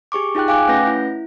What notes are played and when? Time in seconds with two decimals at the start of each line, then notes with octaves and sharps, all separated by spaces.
0.12 G4 G#4 C#6 D6
0.35 D#4 F4 G#4 G5 F#6
0.48 F5 G5 G#5 D6 F#6
0.68 A3 C#4 B4 F#5 G6 A#6
0.87 E4